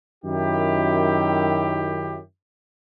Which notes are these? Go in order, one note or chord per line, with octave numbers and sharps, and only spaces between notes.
F#2 D#3 E4 G4